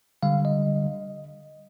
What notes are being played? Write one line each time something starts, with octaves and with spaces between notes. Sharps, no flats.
D3 G3 F5
D#5